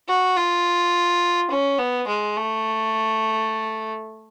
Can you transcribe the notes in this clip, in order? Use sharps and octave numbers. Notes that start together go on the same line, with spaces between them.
F#4
F4
C#4
B3
G#3
A3